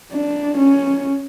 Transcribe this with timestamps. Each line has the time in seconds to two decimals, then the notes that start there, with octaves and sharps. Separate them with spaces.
0.13 D4
0.58 C#4